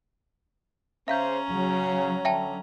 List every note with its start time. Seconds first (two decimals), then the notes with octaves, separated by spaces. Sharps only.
1.08 C#3 C#4 C5 E5 F5 A#5 G6
1.50 C#3 F#3
2.25 D3 E5 G5 A5